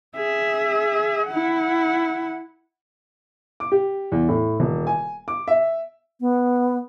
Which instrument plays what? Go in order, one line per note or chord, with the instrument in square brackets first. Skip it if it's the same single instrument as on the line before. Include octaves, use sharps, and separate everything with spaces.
[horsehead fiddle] G#4 E5
E4 F#5
[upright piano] D6
G4
E2
A2
D#1
G#5
D6
E5
[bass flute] B3